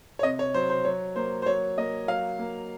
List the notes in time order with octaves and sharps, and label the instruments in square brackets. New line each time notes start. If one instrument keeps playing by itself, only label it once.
[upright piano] C#5
C3 D#5
C#5
F#3 C5
C5
F#3 C#5
A#3 C5
C5
F#3 C#5
A#3 D#5
F#3 F5
A#3